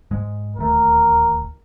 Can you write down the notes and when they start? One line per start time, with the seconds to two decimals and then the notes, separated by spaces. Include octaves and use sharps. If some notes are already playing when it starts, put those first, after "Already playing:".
0.11 G#2 G#3
0.57 D1 D#2 A3 A#4